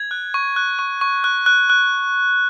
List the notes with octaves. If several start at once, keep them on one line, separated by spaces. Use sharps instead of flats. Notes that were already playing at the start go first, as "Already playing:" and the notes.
Already playing: G#6
F#6
C#6
F#6
C#6
C#6
F#6
F#6
F#6